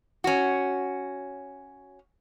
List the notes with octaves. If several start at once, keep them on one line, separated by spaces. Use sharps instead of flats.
C#4 F#4